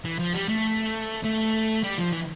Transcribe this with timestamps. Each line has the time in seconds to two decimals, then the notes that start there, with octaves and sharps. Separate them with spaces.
0.05 E3
0.19 F3
0.35 G3
0.49 A3
1.24 A3
1.84 G3
1.98 F3
2.13 E3